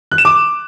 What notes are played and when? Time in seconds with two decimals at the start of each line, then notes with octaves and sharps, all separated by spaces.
0.11 F#6
0.18 E7
0.25 D6